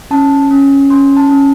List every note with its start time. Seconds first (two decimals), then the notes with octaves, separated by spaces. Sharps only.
0.11 C#4 A5
0.51 C#4
0.90 C#4 C6
1.17 A5
1.29 C#4